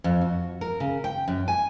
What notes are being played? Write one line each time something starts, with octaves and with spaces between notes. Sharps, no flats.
F2
F#4
A#4
C#3
G5
F#2
G#5